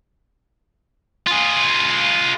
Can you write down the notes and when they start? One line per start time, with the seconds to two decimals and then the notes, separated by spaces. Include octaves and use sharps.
1.27 F4 G#4